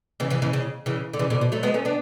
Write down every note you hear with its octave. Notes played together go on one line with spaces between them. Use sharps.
C#3 E3
C#3 E3
C#3 E3
C#3
C#3 E3
D3
C#3 E3
B2 D3
B2
F#3 A3
G#3 B3
A3 C#4
B3 D4